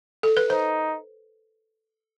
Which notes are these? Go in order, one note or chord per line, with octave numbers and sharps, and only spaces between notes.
A4
B4
D#4 C5